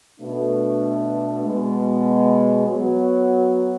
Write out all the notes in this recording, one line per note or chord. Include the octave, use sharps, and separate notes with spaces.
B2 A3 D4
B2 G#3 B3
F#3 B3 F#4